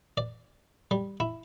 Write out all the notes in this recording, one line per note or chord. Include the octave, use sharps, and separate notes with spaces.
D5
G3
E4